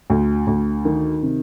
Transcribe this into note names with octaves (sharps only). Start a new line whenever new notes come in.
D2
D2
D#3
C3